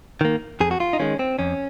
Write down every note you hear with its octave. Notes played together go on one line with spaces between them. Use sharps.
D#3 A#3
F2 G#4
F#4
F4
D#4
D#3 G#3 C#4
C4
F2 C#4